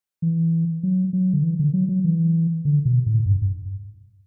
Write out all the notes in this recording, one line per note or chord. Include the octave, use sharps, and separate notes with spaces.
E3
F#3
F#3
D3
E3
D3
F#3
F#3
E3
D3
B2
A2
G2
G2